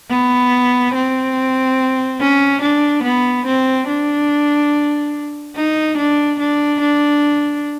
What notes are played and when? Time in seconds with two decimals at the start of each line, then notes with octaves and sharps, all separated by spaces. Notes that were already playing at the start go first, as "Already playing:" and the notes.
0.10 B3
0.94 C4
2.20 C#4
2.62 D4
3.03 B3
3.46 C4
3.87 D4
5.56 D#4
5.98 D4
6.39 D4
6.80 D4